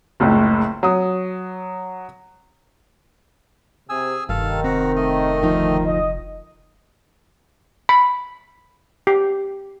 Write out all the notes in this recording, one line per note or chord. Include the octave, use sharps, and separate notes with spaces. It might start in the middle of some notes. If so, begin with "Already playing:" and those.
F#1 C#2 A2
F#3 D#6
C3 G#4 G#5 E6
F1 G2 D#3 A4 F5
C4 F#4 A#5
A3 D#5
D2 F3 D#4
D#5
B5
G4